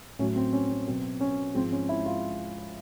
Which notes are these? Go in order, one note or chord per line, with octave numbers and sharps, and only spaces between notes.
A2 F#3 C#4
C4
C#4
C#4
B2 F#3 C4
C#4
G#2 F3 G#3 C4
C#4
E4
F4